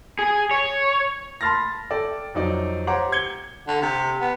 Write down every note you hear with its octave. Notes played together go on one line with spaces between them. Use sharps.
G#4
C#5
A5 B5 C6 F6 A6 A#6
A4 D5 G5 A5
F2 F#3 D#4 D5
G4 C5 C#5 F#5 A#5 D6
G#6 C#7 G7
D3
C3
B3